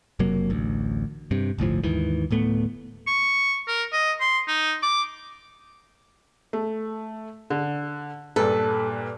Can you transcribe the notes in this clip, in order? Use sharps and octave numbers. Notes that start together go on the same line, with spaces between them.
F#1 C3 F#3 A#3
A1 D2
G2 C3
G1 D2 A2 F3
D#2 G#2 D#3 E3
D1 A2 A3 B3
C#6
A#4
D#5
C6
D#4
D6
A3
D3
G2 A#2 A4 B4